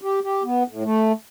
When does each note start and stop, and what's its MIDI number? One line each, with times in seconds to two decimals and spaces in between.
0.02 0.20 67
0.23 0.43 67
0.43 0.63 59
0.68 0.83 45
0.84 1.12 57